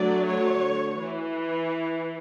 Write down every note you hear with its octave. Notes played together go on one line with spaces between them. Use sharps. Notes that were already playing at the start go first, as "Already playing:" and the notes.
Already playing: D3 F#3 A3 D5
C#5
E3